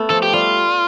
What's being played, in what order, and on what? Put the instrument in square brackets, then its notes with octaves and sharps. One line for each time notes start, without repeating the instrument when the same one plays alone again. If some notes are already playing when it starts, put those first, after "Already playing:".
Already playing: [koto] A3 B3
[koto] F3 [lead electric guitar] A4
[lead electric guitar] G4
[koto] G3 [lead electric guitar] F4